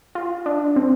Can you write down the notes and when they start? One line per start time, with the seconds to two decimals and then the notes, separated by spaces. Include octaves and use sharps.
0.15 F4
0.46 D4
0.76 C4